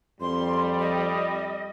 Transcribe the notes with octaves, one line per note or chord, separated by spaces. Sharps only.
F2 G3 C6
D#5